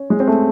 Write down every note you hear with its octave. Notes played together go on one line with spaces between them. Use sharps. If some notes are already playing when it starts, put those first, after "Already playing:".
Already playing: C#4
G#3
C4
A3